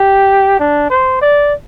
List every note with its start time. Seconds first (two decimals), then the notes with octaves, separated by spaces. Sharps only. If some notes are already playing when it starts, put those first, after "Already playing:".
Already playing: G4
0.60 D4
0.90 C5
1.21 D5